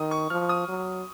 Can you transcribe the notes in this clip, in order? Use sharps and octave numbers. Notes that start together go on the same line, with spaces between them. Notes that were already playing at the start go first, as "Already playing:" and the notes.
Already playing: D#3 D#6
C#6
F3 F6
D#6
F#3